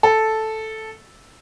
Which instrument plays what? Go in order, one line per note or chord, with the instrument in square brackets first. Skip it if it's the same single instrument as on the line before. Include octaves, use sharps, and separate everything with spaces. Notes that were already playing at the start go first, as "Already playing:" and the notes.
[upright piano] A4